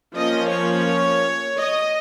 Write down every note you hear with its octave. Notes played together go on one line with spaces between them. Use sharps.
F3 A#3 C#4 D#5
C#5
D#5